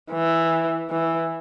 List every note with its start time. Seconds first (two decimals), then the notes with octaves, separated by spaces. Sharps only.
0.11 E3
0.90 E3